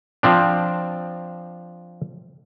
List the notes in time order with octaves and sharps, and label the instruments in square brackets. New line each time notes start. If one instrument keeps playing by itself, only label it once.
[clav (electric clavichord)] F3 C4 D4